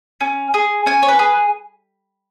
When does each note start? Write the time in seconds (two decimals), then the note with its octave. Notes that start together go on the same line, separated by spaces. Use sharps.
0.21 C#4
0.54 G#4
0.86 C#4 G#5
1.03 C#5
1.08 B4
1.19 G#4